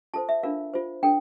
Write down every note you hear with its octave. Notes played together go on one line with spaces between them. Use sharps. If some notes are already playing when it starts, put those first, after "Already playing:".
F4 A4 C5 A5
E5
D4 F4 A#4 F5
F4 C5
D4 A4 G5